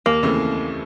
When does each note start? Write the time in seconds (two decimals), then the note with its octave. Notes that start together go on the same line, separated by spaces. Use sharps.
0.06 D#2 A#3
0.23 C#3 E3 A3 C4